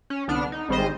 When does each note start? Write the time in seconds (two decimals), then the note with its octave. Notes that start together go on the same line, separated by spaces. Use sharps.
0.10 C#4
0.28 C2 D3 B3 D4 F6
0.52 D#4
0.69 G#1 G#2 G3 G#3 C5 D#5